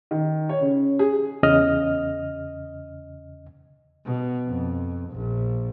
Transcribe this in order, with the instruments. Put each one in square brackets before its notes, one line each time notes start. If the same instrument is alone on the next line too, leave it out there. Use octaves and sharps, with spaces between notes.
[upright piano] D#3
C#5
C#3
G#4
[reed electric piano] E2 C#3 D#5 F6
[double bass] B2
F2
A#1